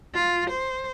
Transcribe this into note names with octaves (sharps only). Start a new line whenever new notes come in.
F4
C5